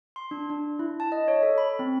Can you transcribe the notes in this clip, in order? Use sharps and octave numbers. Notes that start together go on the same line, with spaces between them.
C6
D4
D4
E4
A5
D#5
C#5
A4
B5
C4